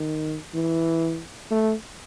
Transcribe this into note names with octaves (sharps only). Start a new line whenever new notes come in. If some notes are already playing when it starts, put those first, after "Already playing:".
Already playing: D#3
E3
A3